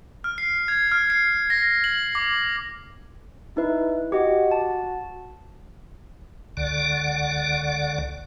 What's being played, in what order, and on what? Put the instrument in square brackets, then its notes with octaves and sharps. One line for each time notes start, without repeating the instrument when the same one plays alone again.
[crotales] F6
C7
G#6
F6
C7
A#6
F#7
D6
[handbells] D#4 B4 [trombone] E4
[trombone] F#4 [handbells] G4 D#5
[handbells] A5
[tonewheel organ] C#2 D3 D5 F#5